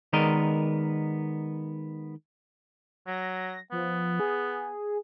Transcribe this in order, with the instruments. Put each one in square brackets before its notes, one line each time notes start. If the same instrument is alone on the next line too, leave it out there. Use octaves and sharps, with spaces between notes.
[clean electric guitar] D#3 G#3 B3 A#4 D5 D#5
[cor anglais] F#3 [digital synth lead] A#6
[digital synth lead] F3 [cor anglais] B3
[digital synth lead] G#4